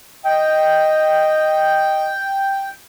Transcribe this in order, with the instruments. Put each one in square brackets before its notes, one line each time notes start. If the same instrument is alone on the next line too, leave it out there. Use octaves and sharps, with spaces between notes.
[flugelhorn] D#5 [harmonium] G5